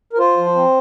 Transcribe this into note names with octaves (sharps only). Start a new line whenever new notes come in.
A#4
F4 C5
F3
C4